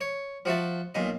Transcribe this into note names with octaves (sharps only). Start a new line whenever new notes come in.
C#5
F3 F#4 E5 A5
B1 A#2 D#5